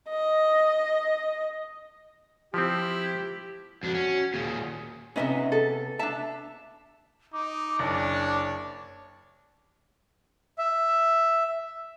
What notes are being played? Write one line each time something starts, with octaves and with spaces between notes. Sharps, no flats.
D#5
F3 C4 E4 G4
F2 D4 F#4
C#4
D#2 A#2 G#4
C3 B3 C#4 D#4 D#5 E5
A4
D4 E5 A5
D#4 D6
F#1 D4 C#5
E5